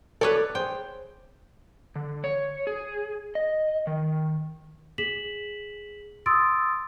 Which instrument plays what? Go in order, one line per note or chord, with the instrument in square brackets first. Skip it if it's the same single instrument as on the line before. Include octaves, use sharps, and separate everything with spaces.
[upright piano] A4 [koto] B4 C#5 D5
[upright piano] D6
[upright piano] G#4 C5 [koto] G5
[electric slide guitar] D3
C#5
G#4
D#5
D#3
[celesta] G#4 B6 E7 F#7
C6 D#6 E6 A6 D7